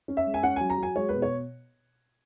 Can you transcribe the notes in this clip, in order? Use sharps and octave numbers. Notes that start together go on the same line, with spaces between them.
C#4
E5
G#3
G#5
C#4 F#5
F#3 G#5
A#5
F#3
G#5
G#3 C#5
B2 B4
C#5